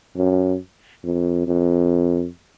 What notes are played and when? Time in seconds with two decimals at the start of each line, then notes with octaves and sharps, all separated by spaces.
0.16 F#2
1.04 F2
1.47 F2